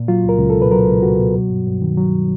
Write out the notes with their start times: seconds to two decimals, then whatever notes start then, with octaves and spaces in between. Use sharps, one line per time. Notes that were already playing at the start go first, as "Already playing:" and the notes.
Already playing: A#2
0.08 F#3 F4
0.24 C#2 A#4
0.39 C#2
0.50 B2 A4
0.62 B4
0.71 F#3 A#4
0.87 C#2
1.02 C#2 F#4
1.19 B2
1.35 F#3
1.50 G2
1.67 G2
1.82 D#3
1.97 F#3